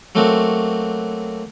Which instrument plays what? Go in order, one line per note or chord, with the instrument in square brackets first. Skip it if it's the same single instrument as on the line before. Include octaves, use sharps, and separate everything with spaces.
[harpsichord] F#3 A3 A#3 C4 F#4